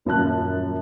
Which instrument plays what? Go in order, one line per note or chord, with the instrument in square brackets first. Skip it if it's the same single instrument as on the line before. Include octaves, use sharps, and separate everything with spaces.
[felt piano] D#1 F#2 A#3 A5 F#6